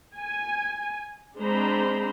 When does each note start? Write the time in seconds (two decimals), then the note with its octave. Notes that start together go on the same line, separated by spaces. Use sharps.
0.17 G#5
1.38 G#3 C4 D4 C5 A#5 B5